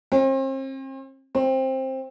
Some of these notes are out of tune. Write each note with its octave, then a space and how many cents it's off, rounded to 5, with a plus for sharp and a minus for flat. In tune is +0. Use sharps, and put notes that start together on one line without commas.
C4 +40
C4 +15